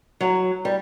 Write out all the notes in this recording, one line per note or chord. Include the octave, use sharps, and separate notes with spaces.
F#3
G3